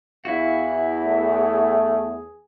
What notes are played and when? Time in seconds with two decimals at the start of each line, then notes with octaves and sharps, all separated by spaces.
0.25 E2 E4 F#4 F5
1.04 A3 G#4